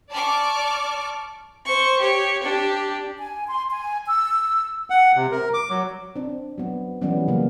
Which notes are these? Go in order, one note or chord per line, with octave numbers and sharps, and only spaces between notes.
D5 A5 C#6 D6 F6
C5 C#6
G4 C#5
D4 G4
G#5
C6
G#5
E6
F#5
C3
A#4
D6
F#3
C4 D4
F#3 B3
E3 F#3 G3 B3 C#4
C#3 F#3 A#3 A#4